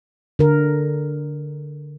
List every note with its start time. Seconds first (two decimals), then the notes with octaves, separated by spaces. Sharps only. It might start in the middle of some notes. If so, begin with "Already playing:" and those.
0.39 D3 A#4